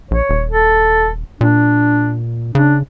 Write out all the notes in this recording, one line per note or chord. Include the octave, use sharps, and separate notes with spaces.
A#1 C#5
D#1
A4
A#2 D4
C#3 D4